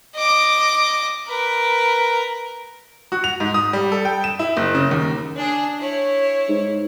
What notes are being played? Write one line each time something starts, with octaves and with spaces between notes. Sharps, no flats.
D#5 D6
A#4 B4
F#4
F7
G#2
D#6
G3
A4
G5
E7
E4
F#1
C#3
D#2
D4 G#4
E4 C#5
G#2